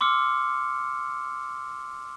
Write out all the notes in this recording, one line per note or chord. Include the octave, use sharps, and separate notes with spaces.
C6 D6 E6 F6 C#7